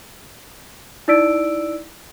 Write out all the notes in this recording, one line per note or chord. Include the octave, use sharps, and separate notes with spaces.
D#4 E4 D5 E6 B6 D7